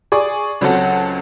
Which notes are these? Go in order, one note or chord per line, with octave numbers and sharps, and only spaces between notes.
G#4 D5 C#6
C#2 F#3 C4 C#4 A4 F#5